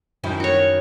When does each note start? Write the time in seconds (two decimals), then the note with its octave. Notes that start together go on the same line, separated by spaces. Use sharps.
0.24 F#2 D#3 E4
0.40 F#4 C#5